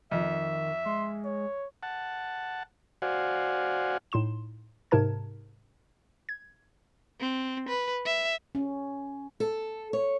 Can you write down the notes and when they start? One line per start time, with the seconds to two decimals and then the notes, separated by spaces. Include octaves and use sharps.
0.12 F2 D#3 E5
0.86 G#3 C6
1.25 C#5
1.83 F#5 A5
3.02 F#4 C5 D5 F5 F#5 G#5
4.12 A2 D#4 C6 E7
4.91 G#2 C3 D#4 A#4 A5 G#6
6.29 G#6
7.20 C4
7.69 B4
8.05 E5
8.55 C#4
9.40 A4
9.93 C#5